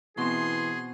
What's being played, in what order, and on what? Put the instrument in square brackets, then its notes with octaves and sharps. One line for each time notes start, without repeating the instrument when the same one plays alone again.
[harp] B2 C4 [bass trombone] E3 [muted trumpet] G#4 [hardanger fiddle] C6